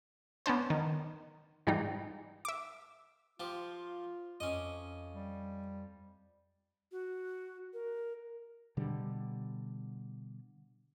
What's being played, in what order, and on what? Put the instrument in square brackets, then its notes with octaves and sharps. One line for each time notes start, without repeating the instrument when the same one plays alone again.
[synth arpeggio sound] B3 C#4 D4 C5
D#3
G#2 E3 G3 D#4
E5 D6
[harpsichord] F3 G4 [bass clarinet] F4
[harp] F2 D6 [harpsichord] C#4 D#5
[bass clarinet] G3
[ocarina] F#4
A#4
[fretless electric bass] B2 D3 G3